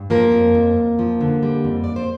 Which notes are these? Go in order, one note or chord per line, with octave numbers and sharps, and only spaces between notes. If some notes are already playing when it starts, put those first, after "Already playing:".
Already playing: G2
F3 A#3 A#4
F2
F2
F2
F3
D3
G3
F2
F2 D5
C5